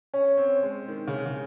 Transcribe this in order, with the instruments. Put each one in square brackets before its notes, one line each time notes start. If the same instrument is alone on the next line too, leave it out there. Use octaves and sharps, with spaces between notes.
[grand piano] C#4 [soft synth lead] C#5
[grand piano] C4
G#3
D#3
C#3
C#3